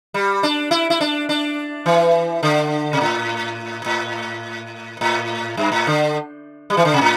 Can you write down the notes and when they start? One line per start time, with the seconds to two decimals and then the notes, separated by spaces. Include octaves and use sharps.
0.14 G3
0.43 D4
0.71 E4
0.90 E4
1.01 D4
1.29 D4
1.86 E3
2.43 D3
2.93 C3
3.01 A2
3.86 A2
5.01 A2
5.57 G2
5.72 A2
5.87 D3
6.70 G3
6.77 E3
6.85 D3
6.94 C3
7.01 A2